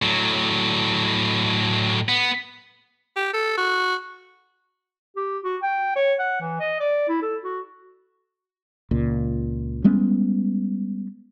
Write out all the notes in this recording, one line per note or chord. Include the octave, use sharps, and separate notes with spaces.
A2 F#3
B3
G4
A4
F#4
G4
F#4
G5
C#5
F#5
E3
D#5
D5
E4
A4
F#4
C#2 A#2
G3 G#3 B3 C#4